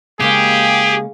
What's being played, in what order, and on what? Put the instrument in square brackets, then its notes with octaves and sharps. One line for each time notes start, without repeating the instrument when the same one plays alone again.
[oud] C#3 G#3 A#3 [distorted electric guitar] G4 [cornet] G#4